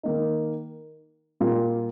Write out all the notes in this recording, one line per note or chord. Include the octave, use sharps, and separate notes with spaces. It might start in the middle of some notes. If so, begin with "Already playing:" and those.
D#3 A#3 D#4
A#2 G3 A#3 F4